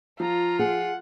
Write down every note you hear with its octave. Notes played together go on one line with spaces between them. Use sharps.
F3 F4 A#5
G#4 F#5